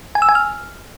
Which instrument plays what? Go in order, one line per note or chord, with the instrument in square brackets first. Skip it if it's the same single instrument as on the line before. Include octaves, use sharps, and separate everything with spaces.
[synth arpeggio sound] G#5
E6
G#5
F6